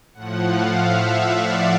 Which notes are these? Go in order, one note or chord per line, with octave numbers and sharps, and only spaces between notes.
A2 F3 F#5
F5
E5
D5